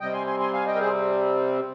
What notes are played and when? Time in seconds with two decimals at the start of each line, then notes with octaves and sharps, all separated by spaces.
0.01 C3 G3 C4 D#5 G5
0.13 G#5 C6
0.27 G#5 C6
0.40 G#5 C6
0.53 F5 G#5
0.67 D#5 G5
0.75 A#4
0.80 G#4 C5